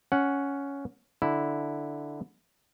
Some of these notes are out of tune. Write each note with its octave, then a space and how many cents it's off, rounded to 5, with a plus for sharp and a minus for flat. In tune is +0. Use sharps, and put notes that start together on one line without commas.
C#4 +10 F#5 +0
D3 +0 E4 -5